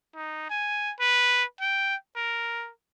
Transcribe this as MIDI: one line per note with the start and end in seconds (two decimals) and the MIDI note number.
0.15 0.48 63
0.50 0.92 80
1.00 1.44 71
1.60 1.95 79
2.16 2.70 70